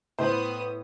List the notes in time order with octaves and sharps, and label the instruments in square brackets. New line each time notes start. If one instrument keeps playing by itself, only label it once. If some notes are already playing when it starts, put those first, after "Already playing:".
[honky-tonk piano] A2 [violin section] B3 D#6 [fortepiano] C5